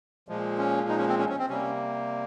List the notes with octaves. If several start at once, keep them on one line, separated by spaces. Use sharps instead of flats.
A#2 F3 G#3
C#4
D#4
C#4
C4
C#4
C#4
C4
C3 G3 A#3 C#4